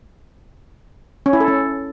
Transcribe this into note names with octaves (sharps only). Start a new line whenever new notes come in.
C#4
E4
A4
C#4